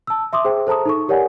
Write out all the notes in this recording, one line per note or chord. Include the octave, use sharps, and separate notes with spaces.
A5 E6
E5 C6 D6 D#6
G#4 C5 E5 G5
A4 C5 A5 A#5 D#6
D#4 A4 C#6
G4 A#4 C#5 D5 F#5 G#5